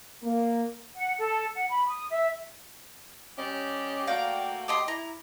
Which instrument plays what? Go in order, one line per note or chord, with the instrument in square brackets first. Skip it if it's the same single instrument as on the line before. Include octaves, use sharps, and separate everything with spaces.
[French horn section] A#3
[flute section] F#5
A4
F#5
B5
D#6
E5
[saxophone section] G3 G4 D#5 [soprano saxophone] C#4
[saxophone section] A3 A#3 F#4 [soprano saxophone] D5 [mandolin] F5 G5 A#5
[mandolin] G4 D#5 C6 [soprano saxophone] G5
[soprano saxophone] E4 [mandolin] A#5